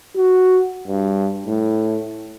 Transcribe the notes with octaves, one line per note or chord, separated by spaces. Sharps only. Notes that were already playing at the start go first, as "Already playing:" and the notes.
F#4
G2
A2